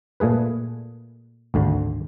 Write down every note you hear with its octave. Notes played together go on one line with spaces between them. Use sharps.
A#2 A3 G#4 B4
G#1 D2 D3